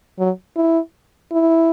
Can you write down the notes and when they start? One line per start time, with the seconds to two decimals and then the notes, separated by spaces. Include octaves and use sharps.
0.19 F#3
0.56 E4
1.32 E4